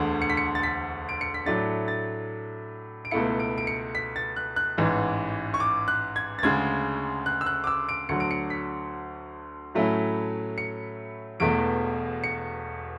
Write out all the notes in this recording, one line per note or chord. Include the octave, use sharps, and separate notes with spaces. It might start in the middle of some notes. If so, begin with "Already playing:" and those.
Already playing: E1 D2 D3
C#7
B6
C#7
A6
B6
D7
C#7
B6
A2 F#3 A3 D4 A6
A6
D7
C#2 B2 A3 E4 C#7
D7
D7
C#7
B6
A6
F#6
F#6
A1 G#2 E3
C#6
D6
F#6
G#6
A6
D2 C#3 G#3 G#6
F#6
E6
F#6
D6
E6
D7
D2 D3 F#3 C#7
D7
C#7
B6
A2 F#3 A3 C#4 E4
C#7
E1 E2 B2 A3 D7
C#7